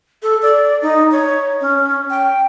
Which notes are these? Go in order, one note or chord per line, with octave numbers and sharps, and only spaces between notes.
A4
D5
D#4
C#5
C#4
G5